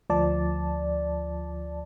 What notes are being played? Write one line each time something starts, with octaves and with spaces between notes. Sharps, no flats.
D2 F3 D5 A5